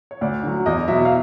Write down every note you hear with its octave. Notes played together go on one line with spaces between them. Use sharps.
C#5
D2 D5
D3 F#3
E2 D#5
B2 F#3 E5
F5